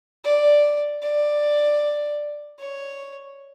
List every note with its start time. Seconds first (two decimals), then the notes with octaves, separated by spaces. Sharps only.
0.24 D5
1.02 D5
2.59 C#5